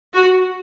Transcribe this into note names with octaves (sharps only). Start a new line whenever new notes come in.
F#4